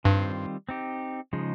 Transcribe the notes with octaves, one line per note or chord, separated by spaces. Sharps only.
G2 D#3 G3 C4 F4 C5
C4 D#4 G4
C#3 F3 G#3 D#4